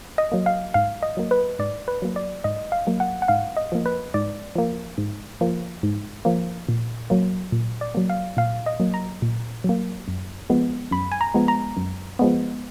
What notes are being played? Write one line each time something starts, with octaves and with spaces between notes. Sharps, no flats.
D#5
F#3 A#3
F5
G#2 F5
D#5
F#3 A#3
B4
G#2 D5
B4
F#3 A#3
D5
G#2 D#5
F5
F#3 A#3
F#5
F#5
G#2 F5
D#5
F3 A#3
B4
G#2 D5
F3 A#3
G#2
F3 A#3
G#2
F3 A#3
A#2
F#3 A#3
A#2
D5
F#3 A#3
F5
A#2 F5
D#5
F#3 A#3
A#5
A#2
F#3 A#3
F#2
F3 G#3 B3
F#2 B5
G#5
A#5
F3 G#3 B3
A#5
F#2
F3 G#3 B3